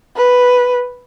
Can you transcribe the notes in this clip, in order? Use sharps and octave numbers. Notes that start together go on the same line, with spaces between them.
B4